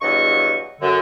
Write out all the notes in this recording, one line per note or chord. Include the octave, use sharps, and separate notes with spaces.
E2 G2 F#3 D#5 C#6
F#2 D3